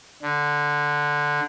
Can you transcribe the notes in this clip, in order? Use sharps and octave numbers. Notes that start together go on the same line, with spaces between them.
D3